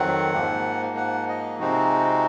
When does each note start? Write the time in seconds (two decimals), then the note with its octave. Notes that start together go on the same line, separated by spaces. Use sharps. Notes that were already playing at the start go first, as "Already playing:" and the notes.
Already playing: F2 D#3 F#3 C4 F#5
0.33 G#2 F3 A#3
0.97 F#5
1.29 D#5
1.59 C3 F3 G#3 C4 D#4 F#4